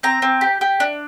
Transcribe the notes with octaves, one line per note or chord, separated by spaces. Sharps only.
C4 A#5
C4
G4
G4
D4